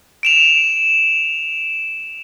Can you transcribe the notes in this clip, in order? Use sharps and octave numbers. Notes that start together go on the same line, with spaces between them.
D7 E7 F7